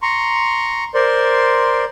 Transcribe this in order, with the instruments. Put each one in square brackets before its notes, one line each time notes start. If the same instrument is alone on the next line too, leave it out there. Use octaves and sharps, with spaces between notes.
[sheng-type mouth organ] A#5 C6 C#6
A#4 C5 D5 C6